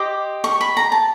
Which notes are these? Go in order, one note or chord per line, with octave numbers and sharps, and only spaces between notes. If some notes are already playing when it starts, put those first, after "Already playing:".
Already playing: G4 C5 D#5 D6
C#6
B5
A#5
A5